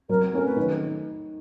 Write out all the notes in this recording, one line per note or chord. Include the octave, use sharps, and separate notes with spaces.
F#3 A#4
A3 C#4 A#4
B4
D#3